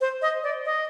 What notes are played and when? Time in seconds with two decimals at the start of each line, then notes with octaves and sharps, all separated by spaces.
0.01 C5
0.22 D#5
0.44 D5
0.65 D#5